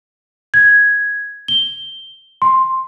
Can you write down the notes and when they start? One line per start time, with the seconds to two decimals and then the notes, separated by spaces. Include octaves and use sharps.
0.54 G#6
1.48 G7
2.42 C6